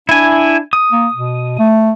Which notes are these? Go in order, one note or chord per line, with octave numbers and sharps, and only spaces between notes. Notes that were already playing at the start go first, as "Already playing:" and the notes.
D4 E4 G#5
D#6
A#3
B2
A3